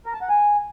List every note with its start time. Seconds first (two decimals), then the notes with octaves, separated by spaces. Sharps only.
0.06 A#4
0.14 A5
0.21 F#5
0.29 G#5